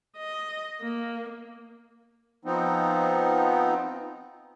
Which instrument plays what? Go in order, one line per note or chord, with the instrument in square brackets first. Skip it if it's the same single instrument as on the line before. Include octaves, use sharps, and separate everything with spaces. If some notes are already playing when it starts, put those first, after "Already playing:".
[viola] D#5
A#3
[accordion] F3 B3 C4 D#4